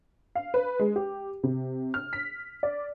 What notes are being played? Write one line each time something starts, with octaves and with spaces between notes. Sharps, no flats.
F5
B4
G#3
G4
C3
F6
B6
D5